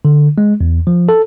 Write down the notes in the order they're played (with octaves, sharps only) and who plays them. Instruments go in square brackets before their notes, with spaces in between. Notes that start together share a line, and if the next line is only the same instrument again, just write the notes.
[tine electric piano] D3
G#3
E2
F3
A4